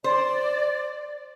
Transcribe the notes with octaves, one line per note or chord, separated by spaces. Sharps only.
C5 D5